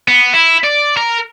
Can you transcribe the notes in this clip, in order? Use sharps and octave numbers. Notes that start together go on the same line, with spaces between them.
B3
E4
D5
A#4